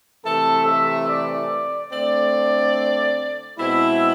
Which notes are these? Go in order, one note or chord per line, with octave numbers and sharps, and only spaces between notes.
C3 E3 A3 A4
E5
D5
D3 A3 C4 D5
B2 G#3 C4 E4